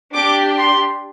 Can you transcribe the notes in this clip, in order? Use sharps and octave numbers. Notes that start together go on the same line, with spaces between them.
D4 G4 D6
C6